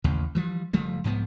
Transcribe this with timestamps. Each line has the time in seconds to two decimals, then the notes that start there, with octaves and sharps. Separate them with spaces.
0.04 A1 D#2 C#3
0.35 E3 F3 G3
0.73 F#1 F3 G3 A3
1.04 C2 G#2 F3 B3